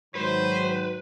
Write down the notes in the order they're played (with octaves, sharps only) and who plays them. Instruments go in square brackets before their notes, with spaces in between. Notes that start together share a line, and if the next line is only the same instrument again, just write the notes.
[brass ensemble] G#2 D#3 F#3 [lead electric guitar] B4 [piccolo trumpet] C5